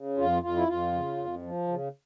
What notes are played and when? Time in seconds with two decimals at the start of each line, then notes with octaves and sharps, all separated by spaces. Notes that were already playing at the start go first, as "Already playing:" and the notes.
Already playing: C#3
0.17 F2 F4
0.43 F2 F4
0.56 E4
0.68 F2 F4
0.93 C#3
1.17 F2
1.42 F3
1.68 C#3